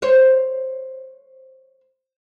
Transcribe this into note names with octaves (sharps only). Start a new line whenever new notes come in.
C5 C#5